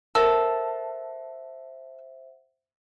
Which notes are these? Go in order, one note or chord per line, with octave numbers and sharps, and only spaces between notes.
A4 A#4 C5 E5 F#5